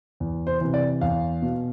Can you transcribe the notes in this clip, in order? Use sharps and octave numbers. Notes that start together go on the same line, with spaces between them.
E2
C5
C3 E3
D5
E2 F5
B2